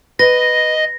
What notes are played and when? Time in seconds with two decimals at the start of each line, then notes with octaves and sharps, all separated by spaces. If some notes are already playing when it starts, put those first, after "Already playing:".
0.19 B4 D#5 A#6